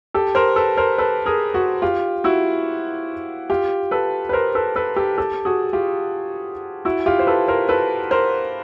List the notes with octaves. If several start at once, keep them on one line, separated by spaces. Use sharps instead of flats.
G4 A4
A#4 C5
A4 B4
A#4 C5
A4 B4
G#4 A#4
F#4 G#4
F4 G4
E4 F#4
F4 G4
A4 B4
B4
A#4 C5
A4 B4
A4 B4
G4 A4
G4 A4
F#4 G#4
F4 G4
E4 F#4
F4 G4
C5
A4 B4
A#4 C5
A4 B4
A#4 C5